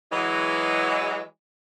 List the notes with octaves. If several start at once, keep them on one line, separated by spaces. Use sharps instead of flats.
E3 F#3 G#3